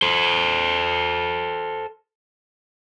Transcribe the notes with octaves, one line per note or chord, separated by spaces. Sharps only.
A4 C5